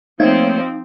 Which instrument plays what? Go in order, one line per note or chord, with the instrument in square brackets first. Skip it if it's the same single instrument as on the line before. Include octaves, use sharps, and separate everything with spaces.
[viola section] F3 C4 [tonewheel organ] A3 A#3 C#5 [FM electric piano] D#4